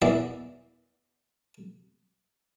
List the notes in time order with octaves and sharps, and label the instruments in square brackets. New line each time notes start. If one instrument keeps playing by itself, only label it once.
[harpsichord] E2 E3 B3 D5 E5